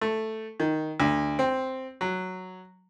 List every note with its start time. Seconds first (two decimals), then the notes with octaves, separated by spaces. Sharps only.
0.01 A3
0.60 D#3
1.00 D2
1.39 C4
2.01 F#3